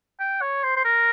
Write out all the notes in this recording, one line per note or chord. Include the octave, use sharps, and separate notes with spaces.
G5
C#5
C5
C5
A#4